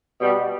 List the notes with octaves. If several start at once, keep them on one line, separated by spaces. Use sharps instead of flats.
B2 G3